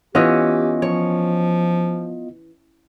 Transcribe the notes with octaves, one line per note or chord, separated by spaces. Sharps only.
E3 B3 C#4 F4 G4 D#5
F3 C#5